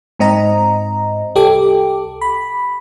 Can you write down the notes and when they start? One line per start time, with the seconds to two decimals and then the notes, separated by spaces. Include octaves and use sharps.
0.19 G#2 C4 D#5 A#5
1.35 C2 G4 A4 D6
2.21 B5